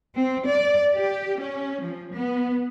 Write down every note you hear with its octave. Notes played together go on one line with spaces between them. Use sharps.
C4
D5
G4
C#4
F3
B3